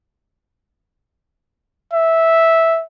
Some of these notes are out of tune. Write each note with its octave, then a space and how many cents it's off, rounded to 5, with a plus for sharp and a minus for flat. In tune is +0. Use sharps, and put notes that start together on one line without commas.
E5 -10